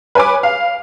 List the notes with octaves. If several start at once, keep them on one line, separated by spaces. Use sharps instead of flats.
B4 C#5 G#5 B5 D6
F5